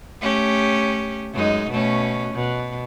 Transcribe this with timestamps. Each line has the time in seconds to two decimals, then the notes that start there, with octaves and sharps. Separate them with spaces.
0.20 A3 C#4 G4
1.33 F#2 G#3 D#4
1.69 B2 A3 C#4
2.34 B2